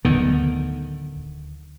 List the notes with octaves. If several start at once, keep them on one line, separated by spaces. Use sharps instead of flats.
D1 D3 D#3 B3